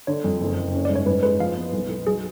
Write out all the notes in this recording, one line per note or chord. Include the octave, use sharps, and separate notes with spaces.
D3 C#5
F2
F#1
F#1
C#4
G#2 D5
C#5
G#2 B4
G#3 B4
F3 F5
B3
B1
B1
F#3 G#4